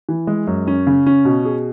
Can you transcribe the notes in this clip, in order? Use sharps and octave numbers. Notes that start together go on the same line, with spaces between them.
E3
G#3
F#2
C#4
C#3
C#4
B2
G#4